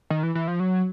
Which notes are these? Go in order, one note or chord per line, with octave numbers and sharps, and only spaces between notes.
D#3
E3
E3
F3
F#3